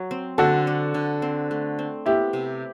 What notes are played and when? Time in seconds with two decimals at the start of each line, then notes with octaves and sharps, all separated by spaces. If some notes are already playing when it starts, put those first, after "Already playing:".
Already playing: F#3
0.11 C4
0.38 D3 F#4 A4
0.67 D4
0.94 D3
1.22 C4
1.51 A3
1.79 C4
2.06 B3 E4 G4
2.33 C3